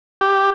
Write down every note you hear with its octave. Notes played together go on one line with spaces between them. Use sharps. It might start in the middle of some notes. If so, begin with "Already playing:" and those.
G4